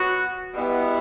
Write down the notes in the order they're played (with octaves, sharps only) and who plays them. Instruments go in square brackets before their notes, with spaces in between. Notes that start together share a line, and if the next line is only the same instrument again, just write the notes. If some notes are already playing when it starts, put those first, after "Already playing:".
Already playing: [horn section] F#3 B3 F#4
B2 G3 B3 E4 G4